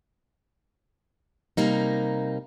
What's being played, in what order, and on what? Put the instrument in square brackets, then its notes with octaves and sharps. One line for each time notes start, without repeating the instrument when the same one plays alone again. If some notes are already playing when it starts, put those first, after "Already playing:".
[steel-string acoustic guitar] C3 G3 A#3 D#4